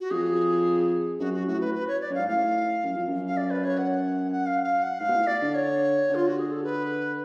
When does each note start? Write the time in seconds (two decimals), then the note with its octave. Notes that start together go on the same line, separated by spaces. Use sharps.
0.01 F#4
0.11 F2 G#4
1.20 F#2 F#4
1.34 F#4
1.47 A2 F#4
1.61 B4
1.75 B4
1.88 C#5
2.01 D5
2.10 F#2
2.14 G#2 F5
2.28 A2 F5
2.84 F#2
2.95 F2
3.08 F#2
3.27 F5
3.37 D5
3.51 B4
3.64 C#5
3.78 F#5
4.32 F#5
4.46 F5
4.64 F5
4.83 F#5
5.00 G#2 F5
5.08 B2
5.14 A2
5.27 D5
5.42 D3
5.54 C#5
6.10 D3
6.15 F4
6.27 F#4
6.39 G#4
6.52 A4
6.64 B4